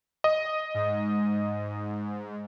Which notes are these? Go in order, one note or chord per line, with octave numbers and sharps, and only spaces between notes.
D#5
G#2